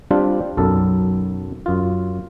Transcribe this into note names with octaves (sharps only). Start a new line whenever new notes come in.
G3 C4 D4 F4 G4
B1 F#2 A4
F#2 F4